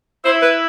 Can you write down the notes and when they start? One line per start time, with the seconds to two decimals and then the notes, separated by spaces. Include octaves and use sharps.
0.25 E4 C5
0.42 B4